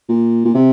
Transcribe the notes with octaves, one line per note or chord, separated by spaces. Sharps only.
A#2
A#2
C3